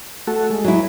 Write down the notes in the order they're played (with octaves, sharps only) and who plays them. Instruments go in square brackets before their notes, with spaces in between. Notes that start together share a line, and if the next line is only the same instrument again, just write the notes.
[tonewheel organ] A3 F#4 A4
G#3
[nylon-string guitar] F#3 E4